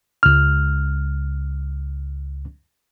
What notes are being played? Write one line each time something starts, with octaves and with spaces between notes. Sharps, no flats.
C#2 F6